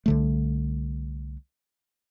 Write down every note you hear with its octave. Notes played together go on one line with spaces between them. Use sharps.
C2 D3 A3